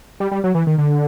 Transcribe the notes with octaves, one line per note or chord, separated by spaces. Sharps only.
G3
G3
F#3
E3
D#3
D3